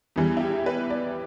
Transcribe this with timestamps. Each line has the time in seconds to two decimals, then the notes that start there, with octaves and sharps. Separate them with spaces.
0.16 E2 E3 G3
0.37 E4
0.40 G4
0.66 B4
0.90 D5